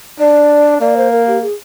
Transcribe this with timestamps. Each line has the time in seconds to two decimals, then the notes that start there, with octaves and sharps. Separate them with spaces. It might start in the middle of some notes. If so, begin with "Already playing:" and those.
0.19 D4 D5
0.80 A#3 D5
0.97 C5
1.12 A#4
1.27 G4
1.42 G#4